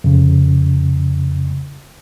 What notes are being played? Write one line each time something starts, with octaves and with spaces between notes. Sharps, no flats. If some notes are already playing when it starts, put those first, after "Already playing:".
F2 C#3